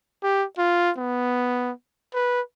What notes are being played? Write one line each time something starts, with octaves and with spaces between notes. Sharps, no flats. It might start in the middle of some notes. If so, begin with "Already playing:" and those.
G4
F4
B3
B4